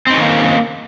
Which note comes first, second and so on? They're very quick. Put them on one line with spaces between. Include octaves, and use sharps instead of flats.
C4 D#4 C#4 D#3 A#3